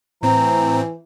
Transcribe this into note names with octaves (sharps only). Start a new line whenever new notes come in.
A2 E3 C4 A#5